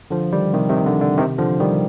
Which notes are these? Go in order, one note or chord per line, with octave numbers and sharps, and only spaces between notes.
D3 F3
D#3 G3
C3 D#3
C3 D#3
D3
D3
C3 D#3
D3 F3
D#3 G3